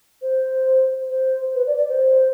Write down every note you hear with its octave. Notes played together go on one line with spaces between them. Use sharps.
C5
C5
B4
D5
D5
C5